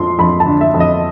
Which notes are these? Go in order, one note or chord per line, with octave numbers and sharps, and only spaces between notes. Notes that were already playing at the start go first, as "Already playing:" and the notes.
Already playing: F2 F3 C6
F2 B5
A5
D3
E5
F2
D#5